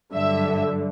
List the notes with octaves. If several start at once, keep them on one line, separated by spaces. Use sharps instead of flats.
G2 D3 F#3 E5